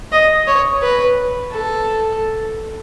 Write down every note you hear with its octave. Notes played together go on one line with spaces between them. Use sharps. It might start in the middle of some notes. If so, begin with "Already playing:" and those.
D#5
C#5
B4
A4